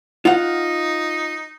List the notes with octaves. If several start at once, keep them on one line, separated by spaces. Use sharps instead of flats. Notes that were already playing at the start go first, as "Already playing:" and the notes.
D#4 F4 F#5